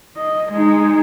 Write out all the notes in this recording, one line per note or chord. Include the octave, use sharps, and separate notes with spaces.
D#5
G#3 D#4